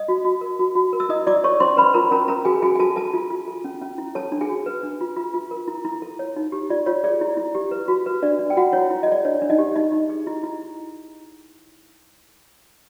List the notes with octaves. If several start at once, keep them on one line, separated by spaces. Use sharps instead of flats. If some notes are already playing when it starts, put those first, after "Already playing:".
Already playing: D#5 D#6
F#4
F#4
A#4
F#4
F#4
A#4
E6
E4 D#5 D#6
E4 D5 D6
A4 C#5 C#6
C#4 C5 C6
C#4 B4 B5
F4 A#4 A#5
C#4 A#4 A#5
C#4 A#4 A#5
F#4 G#4 G#5
F#4 G#4 G#5
G#5
F#4 A4 A5
A4 A5
F4
F4
A4
C#4
C#4
E4
A4 C#5 A5
D4
G#4 G#5
F#4
B4
D4
F4
F4
F4
A#4
E4
E4
A4
C#5
D#4
G4
F4 D5
F4 C#5
G#4 D5
E4
E4
G4
B4
F#4
B4
D4 D5
D4
G5
F4 F#4 F#5
E4 C#5
E4
D#5
G#4 D5
D4 C#5
D4
D#4 D#5
G4
D#4 D#5
D#4
G#4
E4
E4